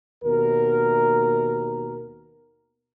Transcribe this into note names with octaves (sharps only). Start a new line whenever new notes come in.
D#2 B2 A#4